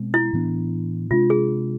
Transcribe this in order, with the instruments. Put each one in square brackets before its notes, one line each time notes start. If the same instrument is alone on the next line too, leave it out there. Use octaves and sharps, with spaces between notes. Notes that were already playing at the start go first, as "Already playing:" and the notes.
Already playing: [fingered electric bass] B2 G#3 C4
[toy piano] E4
[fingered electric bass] A2 E3 B3 D4
[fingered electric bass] C3 G#3 D4 [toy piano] F4
[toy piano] G#4